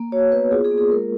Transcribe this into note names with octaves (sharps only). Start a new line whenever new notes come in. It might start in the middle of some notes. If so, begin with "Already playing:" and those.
Already playing: A#3
F#4 C#5
B3 B4
F4 G#4
G#4
A#3
G#4
G#3 A#4